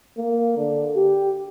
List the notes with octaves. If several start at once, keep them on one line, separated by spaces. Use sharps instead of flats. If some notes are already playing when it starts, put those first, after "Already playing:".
A#3
D3
G4